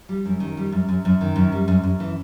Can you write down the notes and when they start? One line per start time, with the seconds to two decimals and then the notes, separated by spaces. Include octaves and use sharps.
0.09 G3
0.26 F#2
0.40 D#3
0.57 G3
0.72 F#2
0.89 F#2
1.05 F#2
1.21 D#3
1.36 F#2
1.52 G3
1.68 F#2
1.83 F#2
2.00 E3